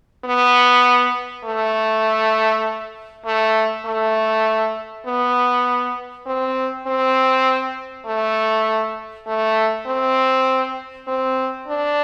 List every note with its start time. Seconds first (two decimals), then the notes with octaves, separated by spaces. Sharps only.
0.24 B3
1.45 A3
3.26 A3
3.86 A3
5.06 B3
6.26 C4
6.87 C4
8.06 A3
9.27 A3
9.87 C4
11.07 C4
11.68 D4